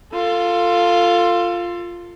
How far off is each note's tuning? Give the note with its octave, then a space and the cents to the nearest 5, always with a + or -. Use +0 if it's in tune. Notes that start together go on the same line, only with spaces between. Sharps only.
F4 +0 A4 +25